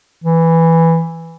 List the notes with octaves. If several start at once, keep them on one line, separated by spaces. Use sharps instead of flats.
E3